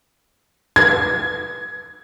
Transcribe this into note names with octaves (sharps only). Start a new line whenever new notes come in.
G#6